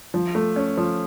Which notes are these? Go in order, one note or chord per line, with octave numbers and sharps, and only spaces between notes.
F3
A3
C#4
F3